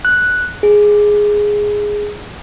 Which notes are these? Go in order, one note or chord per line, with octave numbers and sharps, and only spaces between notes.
F#6
G#4